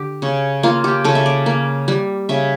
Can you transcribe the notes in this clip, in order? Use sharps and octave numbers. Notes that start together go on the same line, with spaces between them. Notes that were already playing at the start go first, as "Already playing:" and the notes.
Already playing: D3 G4
C#3
A#3 F4
G4
C#3 A4
E5
D5
A#3
G3
C#3 E5